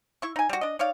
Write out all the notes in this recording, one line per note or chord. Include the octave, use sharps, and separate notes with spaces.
E4 C#6
D#4 G#5
G3 F#4
D4 D#5
D#4 C#5 D5 F5